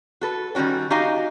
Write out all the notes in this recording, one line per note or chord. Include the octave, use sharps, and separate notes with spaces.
F#4 A4 B4
D#3 G3 C#4 F#4 C#5
D#4 F#4 G4 D#5 F5 G#5